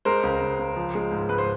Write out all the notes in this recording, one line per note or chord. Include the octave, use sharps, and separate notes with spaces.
G#3 A#4 C5
C#2
C#2
C#2
F3
G#3
G#2
G#2 B4
C5